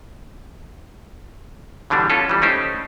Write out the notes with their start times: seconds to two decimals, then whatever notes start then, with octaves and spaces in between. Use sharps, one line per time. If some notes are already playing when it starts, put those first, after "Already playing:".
1.90 B2 D3 E3 G3 D4
2.10 C#4 F4 A4
2.29 E3 G3
2.42 A3 C#4 D#4 G4 C5